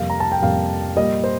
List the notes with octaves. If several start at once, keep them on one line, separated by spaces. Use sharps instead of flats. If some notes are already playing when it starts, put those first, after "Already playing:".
Already playing: F2 C3 G3 A#3 F5
A#5
A5
G5
F2 C3 G3 A#3 F5
A#2 G3 A#3 D#5
C5